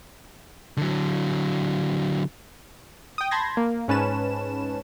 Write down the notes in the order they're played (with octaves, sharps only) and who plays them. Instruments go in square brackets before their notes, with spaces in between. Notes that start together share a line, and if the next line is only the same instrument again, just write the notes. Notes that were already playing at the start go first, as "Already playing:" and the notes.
[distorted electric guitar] D3 F#3
[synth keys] G5 D#6
A5 B5 C6 G6 G#6 A#6
A#3
G#2 C#4 B4 A5 E7